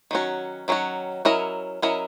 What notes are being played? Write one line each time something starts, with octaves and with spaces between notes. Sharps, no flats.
D#3 F#3 C#4 F#4
D#3 F#3 C#4 F#4
F#3 C#4 E4 A#4 D#5
F#3 C#4 E4 A#4 D#5